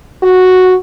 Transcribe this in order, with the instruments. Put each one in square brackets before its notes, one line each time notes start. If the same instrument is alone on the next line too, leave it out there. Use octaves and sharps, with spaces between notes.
[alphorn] F#4